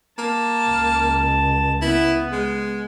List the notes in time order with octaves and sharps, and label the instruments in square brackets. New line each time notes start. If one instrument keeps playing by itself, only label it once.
[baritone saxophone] A#3 [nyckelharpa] A5
[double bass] C#2
[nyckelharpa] B3 [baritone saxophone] E4
[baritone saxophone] G#3